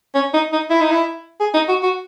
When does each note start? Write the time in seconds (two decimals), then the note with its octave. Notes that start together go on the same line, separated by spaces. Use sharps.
0.15 C#4
0.34 D#4
0.53 D#4
0.70 E4
0.81 D#4
0.91 E4
1.40 G#4
1.54 D#4
1.68 F#4
1.83 F#4